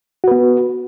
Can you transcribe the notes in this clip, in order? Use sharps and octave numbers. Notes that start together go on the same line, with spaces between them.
B3 F#4 B4